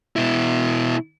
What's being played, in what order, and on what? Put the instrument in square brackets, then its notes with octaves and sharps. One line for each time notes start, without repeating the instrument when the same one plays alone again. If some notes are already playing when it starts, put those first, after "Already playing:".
[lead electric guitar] B2 E4